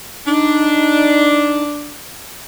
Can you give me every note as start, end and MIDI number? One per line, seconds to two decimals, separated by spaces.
0.26 1.93 62
0.26 1.63 63